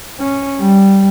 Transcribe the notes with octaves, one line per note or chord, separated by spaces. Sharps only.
C#4
G3